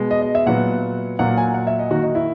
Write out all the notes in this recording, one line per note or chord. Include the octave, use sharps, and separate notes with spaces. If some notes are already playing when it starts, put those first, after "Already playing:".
Already playing: B2 G#3 B3
D#5
D#5
E5
A#2 F#3 B3 F#5
A#2 F#3 A#3 F#5
G#5
F#5
E5
D#5
D#3 A#3 F#4
D#4
E4